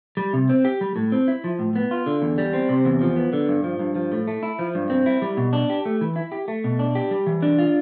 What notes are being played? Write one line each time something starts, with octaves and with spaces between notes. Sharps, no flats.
G3
C3
C4
G4
G3
A2
C4
E4
F3
A2
B3
F4
D3
E2
G3
C4
C3
E2
F3
B3
D3
G2
F3
G2
F3
A2
A3
E4
F3
G2
C4
E4
G3
B2
D4
G4
A3
E3
E4
G4
A3
B2
D4
G4
G3
E3
D4
F4